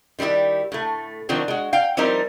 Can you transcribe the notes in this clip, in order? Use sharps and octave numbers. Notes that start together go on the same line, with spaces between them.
D#3 G3 C#4 E4 G4
A2 A3
D#3 F3 F#3 C4 D4
G#3 F#4
F5 G5
F3 G3 C4 D#4 E4 A#4